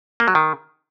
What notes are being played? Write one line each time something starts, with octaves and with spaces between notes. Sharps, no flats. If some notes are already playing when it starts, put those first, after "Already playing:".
A#3
F#3
D#3